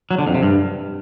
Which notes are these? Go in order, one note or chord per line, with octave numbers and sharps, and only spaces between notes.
F#3
D3
F2
C3
G2